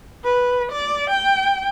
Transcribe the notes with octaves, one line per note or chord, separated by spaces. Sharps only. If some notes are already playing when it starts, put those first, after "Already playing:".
B4
D5
G5